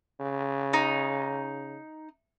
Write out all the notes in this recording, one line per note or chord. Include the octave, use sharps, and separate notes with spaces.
C#3
D#4